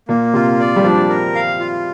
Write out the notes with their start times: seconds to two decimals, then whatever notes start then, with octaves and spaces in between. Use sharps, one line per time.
0.08 A#2 A#3
0.33 C3 F4
0.59 D5
0.76 G3
0.84 F3 D4
1.09 A#4
1.35 F5
1.59 F4